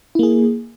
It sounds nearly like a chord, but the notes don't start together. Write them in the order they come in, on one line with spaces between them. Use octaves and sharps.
E4 A#3 G#4